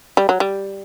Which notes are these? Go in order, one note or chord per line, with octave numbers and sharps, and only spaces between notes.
G3
F#3
G3